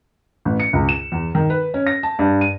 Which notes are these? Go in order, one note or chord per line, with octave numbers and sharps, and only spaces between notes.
A1
C#7
C#2
E7
E2
D#3
B4
C#4
A#6
A5
G2
D#7